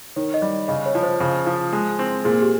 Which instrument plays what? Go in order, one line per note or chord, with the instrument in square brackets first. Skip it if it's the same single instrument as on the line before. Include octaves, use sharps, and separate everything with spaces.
[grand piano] D#3 [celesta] C#5
[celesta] D#5
[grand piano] G3
[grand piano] C#3 [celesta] D#5
[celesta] C#5
[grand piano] F3
[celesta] C5
[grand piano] C#3
F3
G#3
C4
[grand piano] A#2 [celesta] G#4
[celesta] G4